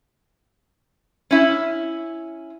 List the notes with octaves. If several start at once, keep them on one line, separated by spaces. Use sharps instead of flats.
C#4 E4